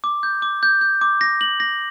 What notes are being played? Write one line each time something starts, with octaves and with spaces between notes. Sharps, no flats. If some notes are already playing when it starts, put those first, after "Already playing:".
D6
G6
D6
G6
G6
D6
A#6
F#7
A#6